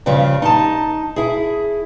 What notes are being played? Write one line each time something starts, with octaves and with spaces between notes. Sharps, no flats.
G2 C#3 F3 G3
D#4 A5
E4 G#4